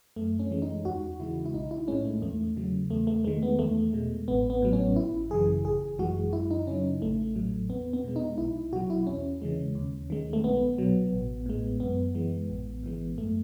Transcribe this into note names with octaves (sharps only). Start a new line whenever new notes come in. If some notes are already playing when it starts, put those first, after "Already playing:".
F#2 A3
C#4
E3 G#3
D#4
E2 F#4
C#3 E3 G#3 E4
E4
B1 D#4
E4
A2 G#3 C#4
A3
E2 A3
C#3 F#3
E2 A3
A3
D#3 G#3 A3
B3
E2 A3
B2 G#3
A1 B3
B3
A2 F#3
C#4
G#1 E4
F#2 C#3 E3 G#4
G#1 G#4
F#2 E3 G#3 F#4
F#2 E4
D#4
C#3 F#3 C#4
A1 A3
A2 F#3
E2 B3
B3
B2 G#3
D#4
B1 E4
B2 F#3 F#4
E4
E2 C#4
C#3 E3 G#3
D#2
D#3 G#3
A3
B1 B3
B2 F#3
A1
A2 G#3
F#2 B3
E3 G#3
A1
G#2 E3 G#3
F#2 A3